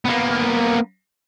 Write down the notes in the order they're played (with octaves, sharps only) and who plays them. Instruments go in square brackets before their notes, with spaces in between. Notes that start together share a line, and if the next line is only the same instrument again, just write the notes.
[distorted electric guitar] A#3 B3